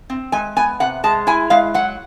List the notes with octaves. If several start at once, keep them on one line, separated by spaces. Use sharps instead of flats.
C4
G#3 G#5
B3 G#5
C3 F#5
G#3 A5
E4 G#5
G#3 F5
F#3 F#5